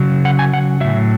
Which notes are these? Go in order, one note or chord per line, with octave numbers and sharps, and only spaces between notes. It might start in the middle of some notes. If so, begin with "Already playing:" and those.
Already playing: C#3 F#3
F#5
G#5
F#5
A2 F#3 E5